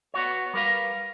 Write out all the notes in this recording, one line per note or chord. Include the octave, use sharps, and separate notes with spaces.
B3 F#4 C#5
G3 A#4 B4 F5